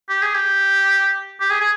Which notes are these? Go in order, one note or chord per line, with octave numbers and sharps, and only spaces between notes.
G4
G#4
G4
G4
G#4
G#4